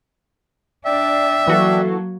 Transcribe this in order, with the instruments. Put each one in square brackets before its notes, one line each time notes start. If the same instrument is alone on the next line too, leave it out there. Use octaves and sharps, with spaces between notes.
[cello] D4 [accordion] D5 G5 [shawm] E5
[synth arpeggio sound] E3 F#4 A4 [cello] F#3 A#3